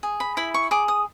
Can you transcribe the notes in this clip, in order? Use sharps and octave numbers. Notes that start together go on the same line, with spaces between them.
G#4
B5
E4 B5
C#6
G#4 D6
D#6